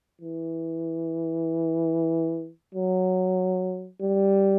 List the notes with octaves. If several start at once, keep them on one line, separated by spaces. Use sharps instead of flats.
E3
F#3
G3